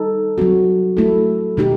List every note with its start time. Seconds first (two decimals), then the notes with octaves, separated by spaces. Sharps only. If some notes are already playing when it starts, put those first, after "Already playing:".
Already playing: G3 D#4 A4
0.38 F#3 C4 F#4
0.97 A3 E4 A4
1.57 B2 A3 D#4 G4